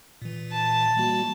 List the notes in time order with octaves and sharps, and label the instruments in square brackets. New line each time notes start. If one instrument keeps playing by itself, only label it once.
[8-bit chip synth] A#2 E3
[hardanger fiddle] A5
[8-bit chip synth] G3 A#3 F#4